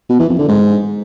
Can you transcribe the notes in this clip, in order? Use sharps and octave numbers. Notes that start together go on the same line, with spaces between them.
B2
E3
F2
D3
G#2